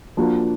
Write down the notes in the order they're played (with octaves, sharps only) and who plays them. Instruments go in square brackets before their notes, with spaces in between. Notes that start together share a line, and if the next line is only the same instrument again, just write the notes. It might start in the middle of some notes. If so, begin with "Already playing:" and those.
[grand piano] F3 A#3 D4 F#4